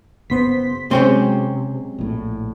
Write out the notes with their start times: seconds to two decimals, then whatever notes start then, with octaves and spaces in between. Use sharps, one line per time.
0.30 F#1 B3 C5 C6 B6
0.91 C3 F#3 G#3 C4 C#4 C5
1.99 A#1 A2